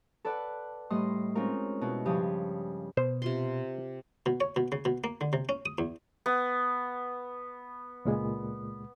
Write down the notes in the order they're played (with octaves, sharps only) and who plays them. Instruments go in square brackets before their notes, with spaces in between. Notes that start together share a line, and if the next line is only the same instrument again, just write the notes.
[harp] A4 B4 D5 F#5
A2 G3 D#5 C6 D#6
G#3 C4 C#4 D#4 F4 A#4
B2 E4
G2 C#3 F3 G4 G#5 D#6
[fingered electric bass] B2 [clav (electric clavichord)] C5
[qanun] C3 F4 C6
[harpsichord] B2
C#5
B2
C#3
B2
A#3
D3
C3
C#4
D#6
E2
[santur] B3
[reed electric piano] C#2 A#2 G#3